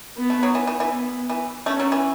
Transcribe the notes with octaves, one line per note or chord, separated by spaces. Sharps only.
B3
A3
F#3
E3
E3
E3
B3
E3
A3 C#4
F#3
E3